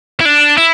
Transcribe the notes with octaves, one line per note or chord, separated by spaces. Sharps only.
E4
D4
E4